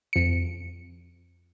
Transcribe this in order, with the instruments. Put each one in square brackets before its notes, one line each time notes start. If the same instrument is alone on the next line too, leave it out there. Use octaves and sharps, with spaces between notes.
[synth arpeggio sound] F2 C#7